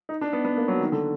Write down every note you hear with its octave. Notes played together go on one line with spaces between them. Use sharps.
D#4
D4
B3
B3
A#3
F#3
D#3
D3